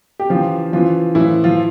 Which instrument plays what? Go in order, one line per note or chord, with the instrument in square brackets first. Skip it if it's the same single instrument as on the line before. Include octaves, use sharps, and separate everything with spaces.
[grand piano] G4
C#3 E3 F3 F4
C#3 E3 F3 F4
A2 E3 F3 E4
F3 F4